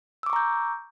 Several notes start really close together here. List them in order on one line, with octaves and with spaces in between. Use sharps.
E6 D6 C#6 A#5 G6